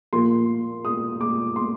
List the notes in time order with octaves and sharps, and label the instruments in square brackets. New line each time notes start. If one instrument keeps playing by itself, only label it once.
[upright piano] A#2 F3 A#3 C6
D#6
D6
C6